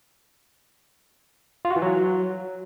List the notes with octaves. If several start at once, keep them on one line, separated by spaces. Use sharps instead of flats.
F4
F#4
E3
F#3